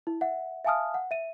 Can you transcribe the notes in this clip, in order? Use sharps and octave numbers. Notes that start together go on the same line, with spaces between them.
E4
E5 F#5
E5 F5 G#5 A5 D#6 F6
F#5
E5 D#7